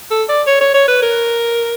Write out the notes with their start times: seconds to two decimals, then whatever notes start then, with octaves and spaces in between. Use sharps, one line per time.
0.11 A4
0.29 D5
0.47 C#5
0.61 C#5
0.74 C#5
0.88 B4
1.02 A#4